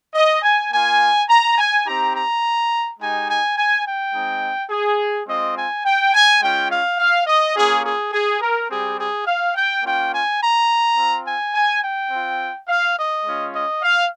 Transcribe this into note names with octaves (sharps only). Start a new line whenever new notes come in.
D#5
G#5
A#3 F4 G#5
A#5
G#5
C4 D#4 G4 A#5
A#5
G#3 D#4 G4 G#5
G#5
G#5
G5
G#3 C4 D#4
G#4
G#3 C4 F4 D#5
G#5
G5
G#5
G#3 C#4 F4 G5
F5
F5
D#5
A#3 C#4 F4 G#4
G#4
G#4
A#4
G3 C4 G4 G#4
G#4
F5
G5
A#3 C#4 F4 G5
G#5
A#5
C4 F4
G#5
G#5
G5
C4 F4
F5
D#5
G#3 C#4 F4
D#5
F5